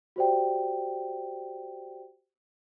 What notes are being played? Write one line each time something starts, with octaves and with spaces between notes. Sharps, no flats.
F#4 G4 C5 D5 G5